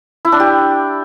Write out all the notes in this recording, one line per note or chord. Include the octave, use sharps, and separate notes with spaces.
E4
D4
G4